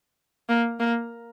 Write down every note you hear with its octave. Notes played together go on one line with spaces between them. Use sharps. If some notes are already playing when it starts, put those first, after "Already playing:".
A#3
A#3